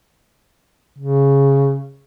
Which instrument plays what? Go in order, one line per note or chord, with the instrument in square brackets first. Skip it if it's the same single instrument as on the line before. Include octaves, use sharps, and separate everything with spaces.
[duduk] C#3